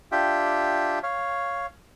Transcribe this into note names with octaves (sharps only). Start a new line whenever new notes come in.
D4 F4 G4 E5 G5
C#5 F5